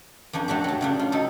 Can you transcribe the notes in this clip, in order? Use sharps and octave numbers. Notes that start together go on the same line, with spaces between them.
F2 F3 D4 G#5
A3 D4 F#4 G4
F#3 A5
C#3 G3 D4
F4
G3 D#4 A4